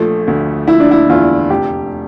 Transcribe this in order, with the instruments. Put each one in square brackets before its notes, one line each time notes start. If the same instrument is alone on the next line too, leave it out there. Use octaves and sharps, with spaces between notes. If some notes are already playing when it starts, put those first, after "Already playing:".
Already playing: [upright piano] A#1 F3 A3
D2
F3 E4
D4
E4
E2 F4
F1 G4